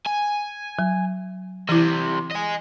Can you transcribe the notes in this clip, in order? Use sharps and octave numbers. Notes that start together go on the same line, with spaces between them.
G#5
F#3
C2 C3 E3 E4
D#5 G#5